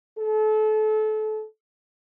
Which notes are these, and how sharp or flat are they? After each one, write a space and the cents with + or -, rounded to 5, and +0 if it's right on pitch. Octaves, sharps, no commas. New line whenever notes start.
A4 -30